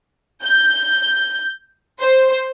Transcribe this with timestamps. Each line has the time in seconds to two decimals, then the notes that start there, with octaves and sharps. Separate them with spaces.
0.44 G6
2.00 C5